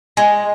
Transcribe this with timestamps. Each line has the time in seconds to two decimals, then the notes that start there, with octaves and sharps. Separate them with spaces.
0.17 G#3